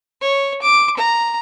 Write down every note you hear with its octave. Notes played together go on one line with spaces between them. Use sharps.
C#5
D6
A#5